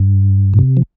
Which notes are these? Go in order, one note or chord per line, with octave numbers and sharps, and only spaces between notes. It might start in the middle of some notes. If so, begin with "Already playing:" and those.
Already playing: G2
A2
C3
F3